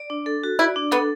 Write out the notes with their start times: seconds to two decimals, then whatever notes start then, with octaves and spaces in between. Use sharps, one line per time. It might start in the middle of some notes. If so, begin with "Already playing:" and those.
Already playing: D5
0.10 D4
0.26 A4
0.44 F#4
0.59 E4 D5
0.76 D4
0.92 B3 A4